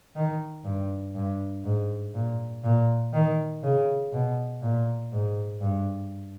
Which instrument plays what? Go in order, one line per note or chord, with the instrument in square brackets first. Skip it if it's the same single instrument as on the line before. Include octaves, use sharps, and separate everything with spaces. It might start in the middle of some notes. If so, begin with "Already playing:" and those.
[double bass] D#3
G2
G2
G#2
A#2
A#2
D#3
C#3
B2
A#2
G#2
G2